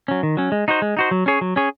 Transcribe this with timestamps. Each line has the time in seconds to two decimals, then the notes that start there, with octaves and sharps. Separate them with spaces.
0.08 F#3 C#4
0.23 D#3
0.37 F#3 C#4
0.52 G#3
0.68 D#4 F#4 C5
0.82 G#3
0.97 D#4 F#4 C5
1.11 F#3
1.26 C#4 G#4 C#5
1.41 F#3
1.56 C#4 G#4 C#5